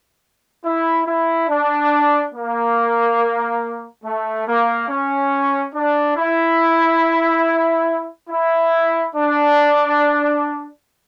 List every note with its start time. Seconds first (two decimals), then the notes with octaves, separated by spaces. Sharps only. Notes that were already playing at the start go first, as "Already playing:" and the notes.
0.64 E4
1.06 E4
1.49 D4
2.34 A#3
4.04 A3
4.47 A#3
4.89 C#4
5.75 D4
6.17 E4
8.29 E4
9.15 D4